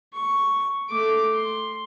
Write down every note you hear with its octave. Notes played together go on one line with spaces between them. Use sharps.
C#6
A3 D6
C6